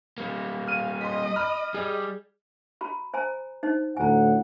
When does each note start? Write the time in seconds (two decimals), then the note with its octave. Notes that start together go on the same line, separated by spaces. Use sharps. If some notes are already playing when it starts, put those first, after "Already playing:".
0.18 G3 A#3
0.67 F5 F6 D#7
1.01 D#5 C6 B6
1.36 B5 F6
1.74 G3 G#4
2.81 F#4 A#5 B5
3.14 C5 G#5 A#5
3.63 D#4 C5
3.97 D2 A2 F#5 G#5 A#5